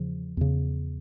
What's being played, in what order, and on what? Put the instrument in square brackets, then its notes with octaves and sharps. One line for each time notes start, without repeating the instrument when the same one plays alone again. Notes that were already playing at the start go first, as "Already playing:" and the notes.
Already playing: [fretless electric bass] E2 C#3 F3
E2 C#3